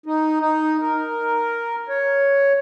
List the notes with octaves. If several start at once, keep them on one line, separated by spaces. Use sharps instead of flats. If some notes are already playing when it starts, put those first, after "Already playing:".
D#4
D#4
A#4
C#5